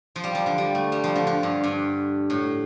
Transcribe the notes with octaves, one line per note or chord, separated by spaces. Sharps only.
F3
G3
F3
D3
G3
A3
G3
F3
D3
D3
G2
G2
A2